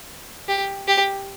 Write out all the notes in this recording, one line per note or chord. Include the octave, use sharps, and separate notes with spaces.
G4
G4